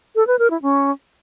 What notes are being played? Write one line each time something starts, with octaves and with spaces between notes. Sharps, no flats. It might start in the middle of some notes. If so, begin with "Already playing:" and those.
A4
B4
A#4
E4
C#4